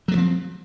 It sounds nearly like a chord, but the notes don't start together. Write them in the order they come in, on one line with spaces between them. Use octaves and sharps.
F#3 A3 F3 C4